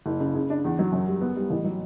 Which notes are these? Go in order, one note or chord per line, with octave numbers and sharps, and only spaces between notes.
F#1
C#3
C#3
D4
E2
F#3
F#2
G3
B3
G3
A1
F#3